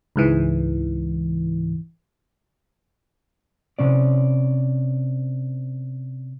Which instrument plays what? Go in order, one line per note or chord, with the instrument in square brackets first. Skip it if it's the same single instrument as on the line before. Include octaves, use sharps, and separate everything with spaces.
[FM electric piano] C#2 G#2 E3
[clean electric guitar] C3 C#4 D5